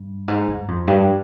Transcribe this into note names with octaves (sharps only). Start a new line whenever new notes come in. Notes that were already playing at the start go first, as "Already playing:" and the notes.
Already playing: G2
G#2
G2
F2
G2